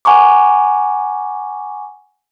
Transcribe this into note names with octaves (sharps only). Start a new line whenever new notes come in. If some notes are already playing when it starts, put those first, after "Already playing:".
F#5 G#5 A#5 C#6 D6